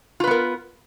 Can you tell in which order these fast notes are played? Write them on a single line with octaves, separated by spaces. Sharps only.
F4 B4 B3 A#4